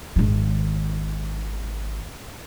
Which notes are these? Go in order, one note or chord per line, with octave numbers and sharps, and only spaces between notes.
G#1 D#3